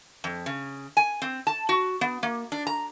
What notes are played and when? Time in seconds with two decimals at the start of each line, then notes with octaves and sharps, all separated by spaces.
0.24 F2
0.46 C#3
0.97 G#5
1.22 C4
1.47 A5
1.69 F#4
2.01 B3
2.23 A#3
2.52 D4
2.67 A#5